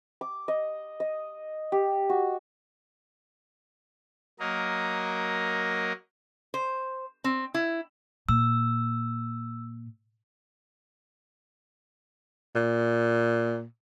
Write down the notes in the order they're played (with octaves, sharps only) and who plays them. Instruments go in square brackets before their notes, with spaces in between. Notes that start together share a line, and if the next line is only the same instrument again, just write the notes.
[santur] D6
D#5
D#5
G4
F#4
[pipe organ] F#3 A#3 A#4 D#5
[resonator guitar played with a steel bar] C5
C4
E4
[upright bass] A#2 [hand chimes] E6
[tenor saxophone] A#2